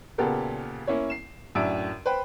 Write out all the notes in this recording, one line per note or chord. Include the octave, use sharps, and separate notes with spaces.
A#2 C#3 B3 G4 A4 A#4
A#3 C#4 E4 C#5
C7 E7
F#2 A2 D4 E5 E6 D7
B4 C5 G5